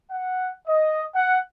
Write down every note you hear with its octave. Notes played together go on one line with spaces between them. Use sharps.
F#5
D#5
F#5